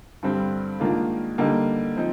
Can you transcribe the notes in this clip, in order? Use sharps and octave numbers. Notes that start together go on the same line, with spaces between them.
G2 D3 G3 C4
G#2 D#3 A#3 D4 F4
D3 G3 A#3 D#4
F3 C4 D#4